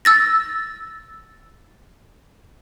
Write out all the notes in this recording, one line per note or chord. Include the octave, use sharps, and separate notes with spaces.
E6 A6 A#6